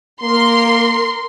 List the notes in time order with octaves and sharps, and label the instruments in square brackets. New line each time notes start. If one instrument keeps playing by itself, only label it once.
[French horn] A#3 [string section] A#4 C6